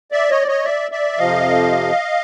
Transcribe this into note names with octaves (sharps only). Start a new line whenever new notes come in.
D5 E5
C#5 D#5
D5
C#5 D#5
D5 E5
D5 E5
F2 C3 F3 D#5 F5